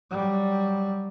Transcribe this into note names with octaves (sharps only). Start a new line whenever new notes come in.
F#3 G3